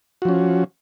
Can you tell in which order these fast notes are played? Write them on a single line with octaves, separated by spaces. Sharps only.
F#4 F3 C#4